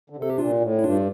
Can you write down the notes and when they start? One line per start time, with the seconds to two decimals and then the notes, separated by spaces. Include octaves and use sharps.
0.10 D3
0.16 C3
0.22 A4
0.30 G4
0.38 A#2 D4 F4
0.61 A2
0.79 E4
0.84 G2 D4 F4